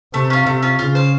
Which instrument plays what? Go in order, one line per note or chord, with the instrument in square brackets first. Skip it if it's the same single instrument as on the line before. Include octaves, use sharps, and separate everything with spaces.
[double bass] C3 [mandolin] A3
[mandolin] C#4 F4
[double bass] C3 [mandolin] A3
[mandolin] C#4 F4
[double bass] C#3 [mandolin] F4
[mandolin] C5 F5